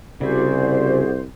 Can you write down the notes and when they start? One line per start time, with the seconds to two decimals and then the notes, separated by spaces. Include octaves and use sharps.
0.21 C2 C#3 E4 F#4 G#4 C5 D5